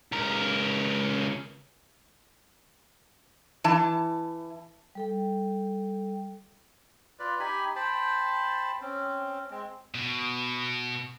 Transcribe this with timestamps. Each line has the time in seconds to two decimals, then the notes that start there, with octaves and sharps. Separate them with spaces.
0.12 C#2 A#4
3.64 E3 A5
4.95 G3 A4 G5
7.19 F4 B4 D5
7.40 D#4 G4 G#5 B5
7.76 C5 G5 A5 B5
8.81 C4 C#4
9.51 G#3 C4
9.95 B2